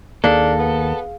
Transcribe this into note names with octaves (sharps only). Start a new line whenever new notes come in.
D#2 D#3 A#3 D4 G#4 A4 F5
B3